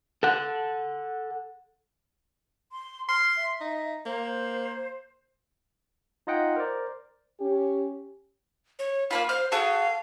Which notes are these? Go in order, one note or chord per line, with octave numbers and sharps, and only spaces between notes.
A4 F#5
C6
C6 F6
E5
D#4
A#3 C5
D#4 F4 D#5 F#5 G5
A#4 C5 D5
C#4 G4
C#5
A#3 C#4 F4 B5
C5 F5
F#4 G#4 A4 F5